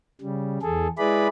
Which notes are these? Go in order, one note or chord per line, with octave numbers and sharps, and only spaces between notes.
C#3 G3
E2 G#4 A4
G#3 E4 G#4 B4 D5 B5